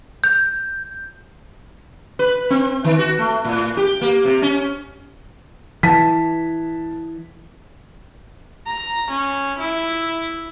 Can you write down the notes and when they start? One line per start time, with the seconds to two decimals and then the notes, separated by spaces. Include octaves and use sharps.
0.24 G6
2.19 B4
2.50 C4
2.84 D#3
2.99 F#4
3.19 A3
3.44 A2
3.77 G4
4.01 A#3
4.25 C3
4.42 C#4
5.83 E3 A5 B6
8.67 A#5
9.10 C#4
9.58 E4